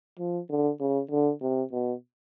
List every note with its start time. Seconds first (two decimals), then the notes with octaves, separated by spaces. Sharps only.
0.19 F3
0.50 D3
0.80 C#3
1.11 D3
1.42 C3
1.72 B2